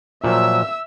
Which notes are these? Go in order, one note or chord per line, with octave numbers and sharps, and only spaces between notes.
A#2 F3 F#3 E5 E6